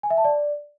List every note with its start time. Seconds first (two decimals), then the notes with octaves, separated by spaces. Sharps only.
0.03 G#5
0.10 E5
0.17 A5
0.25 D5